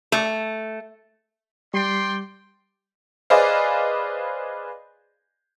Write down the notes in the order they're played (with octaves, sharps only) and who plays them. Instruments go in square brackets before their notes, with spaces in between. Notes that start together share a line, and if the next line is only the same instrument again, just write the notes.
[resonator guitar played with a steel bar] A3
[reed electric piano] G3 [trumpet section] D5 G5 C6
[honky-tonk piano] G#4 B4 C5 D5 D#5 F5